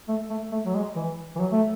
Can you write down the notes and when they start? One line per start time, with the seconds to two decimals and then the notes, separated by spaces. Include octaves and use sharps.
0.08 A3
0.30 A3
0.51 A3
0.66 F#3
0.75 G#3
0.95 E3
1.35 E3
1.39 F#3
1.51 A3